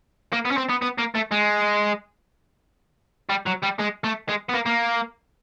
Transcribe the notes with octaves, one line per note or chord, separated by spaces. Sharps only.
A#3
B3
C#4
C4
B3
B3
A#3
A3
G#3
G3
F#3
G3
G#3
A3
G#3
B3
A#3
A#3